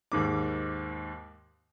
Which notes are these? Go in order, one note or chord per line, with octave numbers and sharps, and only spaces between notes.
D#2 G#2 D6